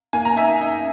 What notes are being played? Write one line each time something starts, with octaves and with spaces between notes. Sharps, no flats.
A#3 G#5
A#5
D#4 E5 G#5
D#4